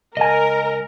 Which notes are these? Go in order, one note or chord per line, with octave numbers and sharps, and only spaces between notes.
C#2 A#4 D#5 G#5